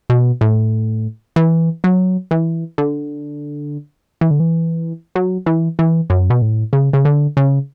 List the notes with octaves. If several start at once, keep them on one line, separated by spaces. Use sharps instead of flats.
B2
A2
E3
F#3
E3
D3
E3
D3
E3
F#3
E3
E3
F#2
B2
A2
C#3
C#3
D3
C#3